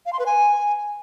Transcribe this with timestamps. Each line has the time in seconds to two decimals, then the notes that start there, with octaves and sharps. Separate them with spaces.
0.06 F5
0.13 C6
0.19 B4
0.26 G#5